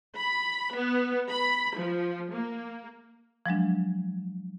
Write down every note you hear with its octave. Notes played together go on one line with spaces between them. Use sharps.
B5
B3
B5
F3
A#3
F3 F#3 G#3 D4